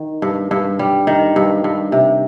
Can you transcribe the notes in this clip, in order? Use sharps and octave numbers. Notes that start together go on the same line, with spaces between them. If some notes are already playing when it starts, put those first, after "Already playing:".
Already playing: D#3
G2
G2
G3
D#3
G2
G2
C3